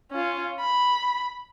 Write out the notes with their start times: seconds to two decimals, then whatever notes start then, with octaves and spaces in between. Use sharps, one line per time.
0.12 C#4 F4
0.60 B5